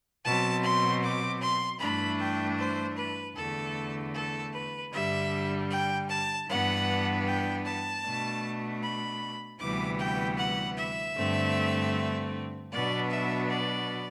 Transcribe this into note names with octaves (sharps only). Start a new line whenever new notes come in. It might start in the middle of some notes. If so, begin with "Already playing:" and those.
B2 F#3 C4 A5
C6
D6
C6
G2 E3 A3 D4 B5
G5
C5
B4
E2 D3 A3 A4
A4
B4
G2 D3 G3 E5
G5
A5
G2 E3 B3 D4 F#5
G5
A5
B2 A3 D4
B5
D2 C3 E3 G3 B3 D6
G5
F#5
E5
G2 D3 A3 C4
B2 F#3 B3 D4 D5
E5
D5